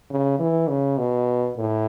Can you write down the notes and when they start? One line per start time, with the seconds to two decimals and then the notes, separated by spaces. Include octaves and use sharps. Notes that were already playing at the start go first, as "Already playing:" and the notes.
0.10 C#3
0.39 E3
0.68 C#3
0.98 B2
1.57 A2